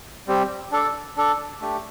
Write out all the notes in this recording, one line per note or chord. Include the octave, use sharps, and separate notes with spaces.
G3 C4 G4
D4 A4 D5
D4 A4 D5
A3 D4 G4